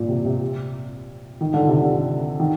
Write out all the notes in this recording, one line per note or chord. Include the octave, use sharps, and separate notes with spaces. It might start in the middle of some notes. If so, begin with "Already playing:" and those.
Already playing: A#2
C3
C3
D#3
D3
C3
D3
D#3